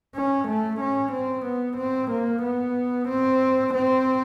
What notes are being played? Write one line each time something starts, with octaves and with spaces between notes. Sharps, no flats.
C#4
A3
C#4
C4
B3
C4
A#3
B3
C4
C4